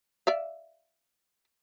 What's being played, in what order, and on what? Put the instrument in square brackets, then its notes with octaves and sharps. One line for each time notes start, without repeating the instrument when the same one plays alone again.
[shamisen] D5 E5 F5